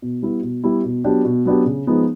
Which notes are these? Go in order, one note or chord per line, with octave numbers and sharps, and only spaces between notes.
B2
G3 B3 E4
B2
G3 B3 E4
B2
F#3 B3 D4 G4
B2
F#3 B3 D4 G4
C#3
F3 G#3 B3 D#4